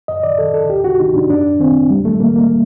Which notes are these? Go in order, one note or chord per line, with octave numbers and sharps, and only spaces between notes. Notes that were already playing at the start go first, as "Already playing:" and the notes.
F#2 D#5
D5
D#3 A4
A4
D2 G4
F#4
C3 D#3 D#4
D4
F#2 D4
D#3 C4
D#2 G3
A3
D#3 A#3
A#3